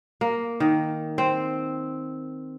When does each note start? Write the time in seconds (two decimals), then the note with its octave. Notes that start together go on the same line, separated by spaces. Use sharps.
0.21 A#3
0.60 D#3
1.18 C4